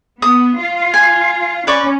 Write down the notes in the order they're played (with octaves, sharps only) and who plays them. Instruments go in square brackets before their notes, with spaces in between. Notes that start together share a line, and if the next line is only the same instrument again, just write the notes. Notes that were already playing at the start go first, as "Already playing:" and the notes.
[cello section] B3 [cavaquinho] D#6
[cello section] F4
[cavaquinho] G#5
[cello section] C#4 [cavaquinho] B4 D5 C#6